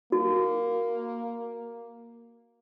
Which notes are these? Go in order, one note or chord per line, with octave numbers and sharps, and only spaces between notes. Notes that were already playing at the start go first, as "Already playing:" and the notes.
A#3 F#4